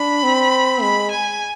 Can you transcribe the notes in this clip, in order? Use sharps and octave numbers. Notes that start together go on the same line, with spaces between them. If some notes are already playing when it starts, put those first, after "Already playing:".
Already playing: D4 B5
C4
G#3 B5
G#5